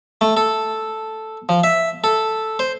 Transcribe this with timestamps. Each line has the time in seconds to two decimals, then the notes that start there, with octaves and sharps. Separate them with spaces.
0.21 A3
0.37 A4
1.49 F3
1.64 E5
2.04 A4
2.59 C5